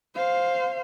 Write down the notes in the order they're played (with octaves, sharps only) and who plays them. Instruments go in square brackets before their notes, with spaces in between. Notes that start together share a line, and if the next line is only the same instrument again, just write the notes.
[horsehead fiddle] C5 F5